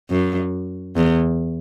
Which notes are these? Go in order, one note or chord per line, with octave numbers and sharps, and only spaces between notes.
F#2
E2